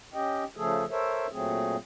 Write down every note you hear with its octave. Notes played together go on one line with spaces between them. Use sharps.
C#4 G4 D#5 G5
C#3 F3 A3 G#4 A4
A4 A#4 C5 C#5 E5
A#2 F#3 A3 C4 G#4